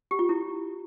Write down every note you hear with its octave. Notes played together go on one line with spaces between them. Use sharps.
G4
F4
E4